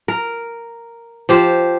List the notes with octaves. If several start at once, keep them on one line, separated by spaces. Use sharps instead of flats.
A#4
F3 G4 C5